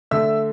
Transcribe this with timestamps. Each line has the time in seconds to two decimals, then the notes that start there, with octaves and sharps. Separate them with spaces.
0.11 D3 A3 E5 E6